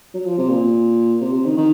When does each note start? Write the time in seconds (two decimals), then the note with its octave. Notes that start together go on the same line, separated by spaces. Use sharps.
0.14 F#3
0.26 F3
0.38 C3
0.49 A#2
1.21 C3
1.33 C3
1.45 D#3
1.57 D#3